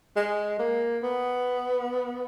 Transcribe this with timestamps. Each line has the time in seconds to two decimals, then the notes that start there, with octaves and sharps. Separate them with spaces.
0.16 G#3
0.59 A#3
1.03 B3